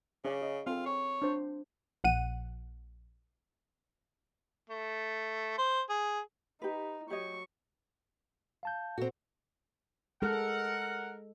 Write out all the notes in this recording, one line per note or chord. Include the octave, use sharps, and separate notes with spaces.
C#3 C#4 D5
G#4 D#5
C4 F4 A4
C#5
D4 C5
A#1 F#5 D#7
A3
C5
G#4
D#4 G4 B4
F#3 G4 C#5 D#5 C#6
F5 A5 G6
A#2 C4 F#4 A4
G#3 A4 A#4 F#5